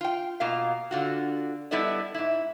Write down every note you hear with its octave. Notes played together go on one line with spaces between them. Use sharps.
F4 G5
B2 A#3 F4 F5
D3 F4 F#4
G3 B3 E4 A4 D5 D#5
G#2 E4